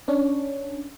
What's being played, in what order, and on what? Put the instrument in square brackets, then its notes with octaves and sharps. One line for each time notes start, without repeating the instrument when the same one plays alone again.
[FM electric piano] C#4 D4